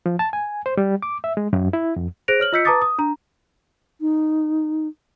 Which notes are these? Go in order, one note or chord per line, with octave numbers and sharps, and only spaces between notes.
F3
A5
G#5
C5
G3
D6
E5
G#3
F#2
E4
F2
G#4 C5 F#6 A#6 D7 F7
C#5 F6 F#7
F4 D#5 E6 G6 B6 C#7
B4 A5 A#5 D6 D#6 A6
D#6
D4 A#5
D#4